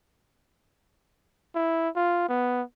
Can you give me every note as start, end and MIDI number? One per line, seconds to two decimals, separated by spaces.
1.55 1.89 64
1.96 2.24 65
2.29 2.62 59